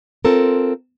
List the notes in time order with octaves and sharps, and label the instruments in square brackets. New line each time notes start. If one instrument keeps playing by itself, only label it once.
[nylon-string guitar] C4 F4 A4 A#4